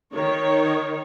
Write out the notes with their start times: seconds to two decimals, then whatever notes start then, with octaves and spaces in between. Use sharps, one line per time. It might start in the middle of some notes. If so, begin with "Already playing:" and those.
0.13 D#3 C#5